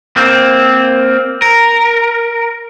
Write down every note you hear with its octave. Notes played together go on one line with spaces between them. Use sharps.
A#3 C4
A#4